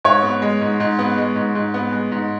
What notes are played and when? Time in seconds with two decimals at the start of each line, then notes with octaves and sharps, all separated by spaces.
0.05 G#2 C#5
0.23 B3
0.42 G#3
0.61 G#2
0.80 G#2
0.99 B3
1.17 G#3
1.36 G#2
1.55 G#2
1.74 B3
1.92 G#3
2.12 G#2